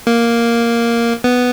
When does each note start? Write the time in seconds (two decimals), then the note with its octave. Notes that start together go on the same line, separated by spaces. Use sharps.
0.07 A#3
1.24 B3